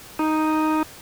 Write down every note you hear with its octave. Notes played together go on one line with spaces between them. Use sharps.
D#4